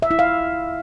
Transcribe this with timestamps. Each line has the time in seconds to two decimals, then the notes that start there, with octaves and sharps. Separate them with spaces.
0.02 E5
0.11 E4
0.19 F5